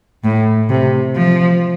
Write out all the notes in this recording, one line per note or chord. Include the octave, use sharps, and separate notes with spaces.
A2
C3
F3